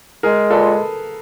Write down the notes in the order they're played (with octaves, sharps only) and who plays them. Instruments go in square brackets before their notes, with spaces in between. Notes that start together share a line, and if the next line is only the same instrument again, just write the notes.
[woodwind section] G#3 [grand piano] G#4 A#4
[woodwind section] A#2 [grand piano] A4 B4